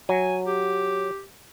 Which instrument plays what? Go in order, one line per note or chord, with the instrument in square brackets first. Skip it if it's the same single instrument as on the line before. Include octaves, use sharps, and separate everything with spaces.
[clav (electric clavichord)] F#3 [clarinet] G#5
[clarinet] G4